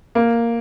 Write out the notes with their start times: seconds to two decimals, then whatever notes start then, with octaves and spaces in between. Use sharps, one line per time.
0.15 A#3